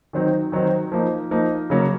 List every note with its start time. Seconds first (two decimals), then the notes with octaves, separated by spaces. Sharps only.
0.13 D#3 F#3 C4 D#4
0.52 D#3 F#3 C4 D#4
0.92 F3 A#3 D#4
1.31 F3 A#3 D#4
1.70 C#3 F#3 A#3 C#4